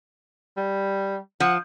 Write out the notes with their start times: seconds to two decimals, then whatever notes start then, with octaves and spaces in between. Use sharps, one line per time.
0.57 G3
1.40 F3 F#5